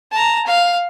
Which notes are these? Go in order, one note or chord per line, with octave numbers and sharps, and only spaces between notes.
A5 A#5
F5